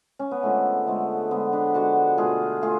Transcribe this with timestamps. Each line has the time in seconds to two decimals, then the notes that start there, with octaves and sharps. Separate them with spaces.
0.19 C#4
0.31 B3
0.43 D3 F3 G#3 A3
0.87 D3 F3 G#3 A3
1.31 D3 F3 G#3 B3
1.53 B3 D4
1.74 D3 F3 G#3 D4 F#4
2.18 B2 A3 F4 G#4
2.62 A3 F4 G#4